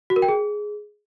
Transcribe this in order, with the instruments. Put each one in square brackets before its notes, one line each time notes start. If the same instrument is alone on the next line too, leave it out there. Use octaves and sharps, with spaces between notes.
[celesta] F#4
A#4
G5
G#4